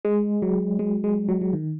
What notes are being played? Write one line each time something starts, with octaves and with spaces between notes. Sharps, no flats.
G#3
F#3
G#3
G#3
F#3
F#3
D#3